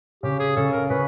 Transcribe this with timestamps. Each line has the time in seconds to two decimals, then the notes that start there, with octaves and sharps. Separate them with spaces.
0.23 C#3 G4
0.40 G#4
0.56 C#3 A4
0.73 A#4
0.89 C#3 B4